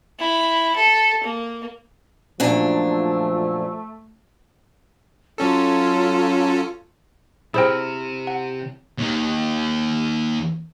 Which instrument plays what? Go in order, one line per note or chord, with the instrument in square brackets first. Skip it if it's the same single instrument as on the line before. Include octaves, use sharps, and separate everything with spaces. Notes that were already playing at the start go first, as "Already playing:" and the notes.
[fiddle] E4
A4
A#3
[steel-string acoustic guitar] F#2 A#2 D4 [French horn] F3 [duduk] A3
[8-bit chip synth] F#3 C#4 A4 [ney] F4
[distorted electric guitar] C3 [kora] E4 A#4 [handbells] G#4 C5 G5
[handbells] F#5
[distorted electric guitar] D#2 D#3